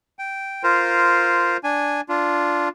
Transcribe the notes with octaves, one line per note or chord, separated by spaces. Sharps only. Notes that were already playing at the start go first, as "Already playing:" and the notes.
G5
F4 A#4 C5
D4 G#5
D4 F4